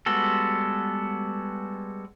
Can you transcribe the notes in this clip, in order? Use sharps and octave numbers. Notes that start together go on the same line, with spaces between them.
G3 G#3 B3 F#4 A4